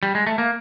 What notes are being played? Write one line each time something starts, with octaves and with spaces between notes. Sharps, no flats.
G3
G#3
A3
A#3